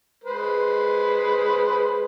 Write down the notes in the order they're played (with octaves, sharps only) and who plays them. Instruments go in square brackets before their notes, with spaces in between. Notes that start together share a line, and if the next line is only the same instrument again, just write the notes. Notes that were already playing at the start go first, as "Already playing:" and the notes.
[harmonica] G#3 B4 C5